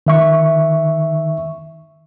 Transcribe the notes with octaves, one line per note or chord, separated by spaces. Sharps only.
D#3 E5 C#6